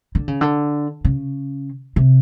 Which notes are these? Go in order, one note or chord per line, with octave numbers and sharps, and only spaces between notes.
D3
C#3
D3
C#3
C3